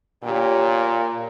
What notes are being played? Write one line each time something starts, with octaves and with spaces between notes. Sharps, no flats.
A#2 G4 C#5